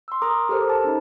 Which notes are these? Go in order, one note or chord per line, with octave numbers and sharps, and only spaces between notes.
C6 E6
A#4 A#5 D6 D#6
G4 A4 A#4 C5
A5
C#4 D#4